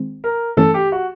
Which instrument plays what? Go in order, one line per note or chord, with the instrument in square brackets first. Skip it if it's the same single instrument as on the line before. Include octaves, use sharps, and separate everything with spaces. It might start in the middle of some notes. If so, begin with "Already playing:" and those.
Already playing: [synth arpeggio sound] D#3 G#3 C4
[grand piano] A#4
[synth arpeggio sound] G2 E3 A3 C#4 [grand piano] A4
[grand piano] G4
F#4